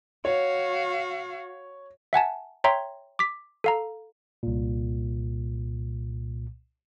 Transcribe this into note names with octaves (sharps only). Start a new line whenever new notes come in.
F#4 C#5 F5
E5 F#5 G#5 A5
C#5 E5 G5 A#5 C6
D6 B6
A4 F5 A#5
C2 A#2